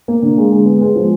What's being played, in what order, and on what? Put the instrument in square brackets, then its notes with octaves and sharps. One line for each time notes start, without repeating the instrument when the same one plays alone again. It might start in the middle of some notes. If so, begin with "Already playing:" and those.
[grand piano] A#3
D3
G#3
G#3
B3
G#3
F3